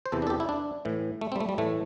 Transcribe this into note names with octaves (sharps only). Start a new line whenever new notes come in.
C5
E2 C3 E3 A4
D4
A4
G4
E4
D4
A2 E3
A3
C4
G3
A3
G3
A2 E3 A3